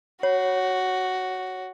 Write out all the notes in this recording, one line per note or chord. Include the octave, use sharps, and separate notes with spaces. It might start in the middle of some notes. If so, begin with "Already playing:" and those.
F#4 C#5